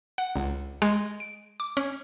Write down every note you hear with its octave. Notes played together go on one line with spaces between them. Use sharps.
F#5
C#2
G#3
D7
D6
C#4